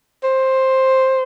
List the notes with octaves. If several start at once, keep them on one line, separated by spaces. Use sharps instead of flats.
C5